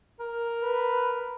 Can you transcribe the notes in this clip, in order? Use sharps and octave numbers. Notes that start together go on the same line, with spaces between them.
A#4
B4